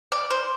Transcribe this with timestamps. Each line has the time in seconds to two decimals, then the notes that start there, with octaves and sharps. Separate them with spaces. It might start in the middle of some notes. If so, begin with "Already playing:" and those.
0.12 D5
0.30 C5